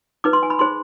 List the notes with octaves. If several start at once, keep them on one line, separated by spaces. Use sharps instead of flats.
D#4 B4 D6
C6
G#5
B5
D#4 G#4 C5 C6